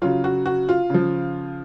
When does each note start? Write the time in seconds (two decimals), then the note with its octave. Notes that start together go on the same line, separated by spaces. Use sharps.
0.02 C#3 F#3 F4
0.24 F#4
0.46 F#4
0.69 F4
0.90 C#3 F3